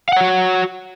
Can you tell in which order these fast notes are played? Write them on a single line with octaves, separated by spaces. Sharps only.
F5 F#5 C#5 F#4